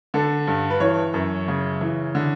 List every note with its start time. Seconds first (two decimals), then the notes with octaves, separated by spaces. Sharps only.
0.14 D3 A4
0.47 G2
0.70 B4
0.80 E3 C#5
1.14 F#2
1.48 C#3
1.81 E3
2.15 D3